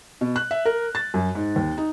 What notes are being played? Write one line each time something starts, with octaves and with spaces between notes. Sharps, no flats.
B2
F#6
E5
A#4
A6
F#2
G#2
D#2
D#4